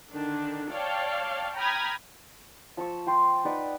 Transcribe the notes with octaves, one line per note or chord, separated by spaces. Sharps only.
D3 D#3 D4
C#5 D5 F5 G5 A5
G5 A#5 B5 D#6 F6 G#6
F3 A5 C#6 E6
F4 G5 C6
D#4 B4 D5 F#5